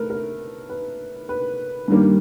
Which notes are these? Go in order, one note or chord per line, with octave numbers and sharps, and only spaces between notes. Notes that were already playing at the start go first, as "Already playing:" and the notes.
Already playing: A3 A#4 B4
A#4
B4
B4
G2 D#3 G3 A#3